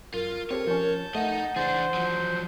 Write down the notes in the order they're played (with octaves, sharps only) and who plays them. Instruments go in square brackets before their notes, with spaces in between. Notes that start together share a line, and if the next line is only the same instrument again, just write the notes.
[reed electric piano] F#2 [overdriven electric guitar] F4 [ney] A#4
[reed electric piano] C4 G4 A4 [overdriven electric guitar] C#5
[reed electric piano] F3 C#4 [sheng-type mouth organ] A5 G6
[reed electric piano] A3 [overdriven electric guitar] D#4 D#5 [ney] F#5
[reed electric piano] C#2 E3 A6 [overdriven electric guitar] D4 G#4 [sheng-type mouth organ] C5
[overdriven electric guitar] F3 F#3